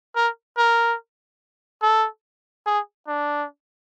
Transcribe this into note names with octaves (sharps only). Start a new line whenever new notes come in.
A#4
A#4
A4
G#4
D4